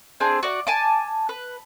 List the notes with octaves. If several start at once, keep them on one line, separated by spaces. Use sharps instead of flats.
C4 D4 G#4
F#4 D5
G#5 A5 D6
B4